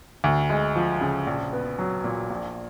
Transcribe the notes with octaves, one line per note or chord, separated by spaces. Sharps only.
D2
G#3
F3
C#3
A#1
B3
F#3
A#2
A#1